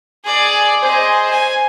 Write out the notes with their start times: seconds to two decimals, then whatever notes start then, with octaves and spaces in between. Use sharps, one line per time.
0.24 G#4 D5
0.82 G#4 C5 D#5
1.30 G#5